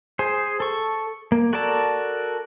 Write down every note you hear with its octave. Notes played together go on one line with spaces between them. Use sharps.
G#4 C5
A4 C#6
A#3
F#4 A4 A#4 D5 A5